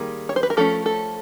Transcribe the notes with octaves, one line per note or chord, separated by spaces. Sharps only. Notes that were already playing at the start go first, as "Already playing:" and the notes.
Already playing: D#3 G3 A#3 G#4
C#5
C5
B4
A#4
F3 A3 C#4 A4
A4